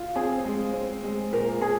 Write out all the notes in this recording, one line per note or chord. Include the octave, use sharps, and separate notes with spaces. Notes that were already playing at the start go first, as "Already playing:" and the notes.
Already playing: F4
C4 G#4
G#3
C4
G#3
A#2 A#4
A#2 G#4